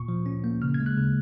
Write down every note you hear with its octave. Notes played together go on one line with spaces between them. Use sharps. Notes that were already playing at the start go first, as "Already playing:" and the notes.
Already playing: A#2 C#6
F3
C#4
A#3
C#3 F6
G#6
G#3
F#6
C#3